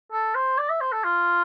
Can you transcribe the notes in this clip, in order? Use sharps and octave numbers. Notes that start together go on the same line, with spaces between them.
A4
C5
D5
E5
C5
A4
F4